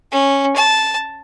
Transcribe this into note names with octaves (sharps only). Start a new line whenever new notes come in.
C#4
A5